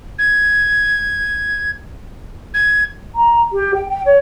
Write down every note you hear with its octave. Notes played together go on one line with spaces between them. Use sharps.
G#6
G#6
A#5
G4
G5
G5
C#5